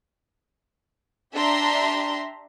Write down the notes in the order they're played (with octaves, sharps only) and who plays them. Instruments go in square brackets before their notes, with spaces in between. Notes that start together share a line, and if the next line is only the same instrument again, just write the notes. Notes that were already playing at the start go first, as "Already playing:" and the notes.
[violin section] D4 G4 E5 A#5 C6